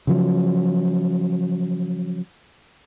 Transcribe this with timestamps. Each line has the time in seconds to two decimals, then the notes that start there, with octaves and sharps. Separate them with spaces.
0.07 C#3 F3 F#3